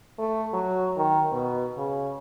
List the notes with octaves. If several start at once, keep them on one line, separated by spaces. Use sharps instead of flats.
A3
F#3
D#3
B2
C#3